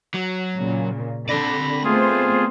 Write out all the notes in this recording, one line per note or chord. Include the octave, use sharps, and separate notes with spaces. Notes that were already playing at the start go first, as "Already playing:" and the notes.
F#3
A#2 C#3
D3 C4 D5 B5 A#6
A3 B3 F4 G#4 C5